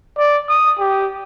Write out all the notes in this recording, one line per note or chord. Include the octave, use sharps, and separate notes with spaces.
D5
D#6
G4